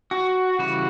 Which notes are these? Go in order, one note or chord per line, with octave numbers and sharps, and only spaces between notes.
F#4
C#3 E3 G3 F#4